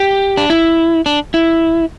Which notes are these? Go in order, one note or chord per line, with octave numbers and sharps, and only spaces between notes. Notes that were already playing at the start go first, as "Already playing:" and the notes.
Already playing: G4
D4
E4
D4
E4